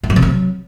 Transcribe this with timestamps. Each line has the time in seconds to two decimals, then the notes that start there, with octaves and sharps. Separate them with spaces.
0.03 F3
0.10 F#3
0.16 C3
0.22 F#3